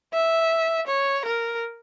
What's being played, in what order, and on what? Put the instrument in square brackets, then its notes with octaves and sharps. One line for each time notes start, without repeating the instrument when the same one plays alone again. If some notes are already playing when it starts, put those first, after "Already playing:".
[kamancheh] E5
C#5
A#4